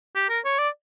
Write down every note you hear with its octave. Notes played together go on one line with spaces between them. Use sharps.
G4
A#4
C#5
D5